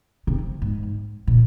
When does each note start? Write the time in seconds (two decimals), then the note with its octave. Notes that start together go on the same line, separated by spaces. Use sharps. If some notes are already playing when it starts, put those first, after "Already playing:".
0.27 C3
0.62 G#2
1.27 A#2